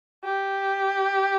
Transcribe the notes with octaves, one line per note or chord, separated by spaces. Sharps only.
G4